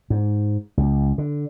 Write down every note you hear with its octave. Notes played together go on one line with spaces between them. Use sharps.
G#2
C#2
D3